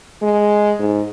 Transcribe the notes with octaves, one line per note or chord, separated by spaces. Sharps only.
G#3
G#2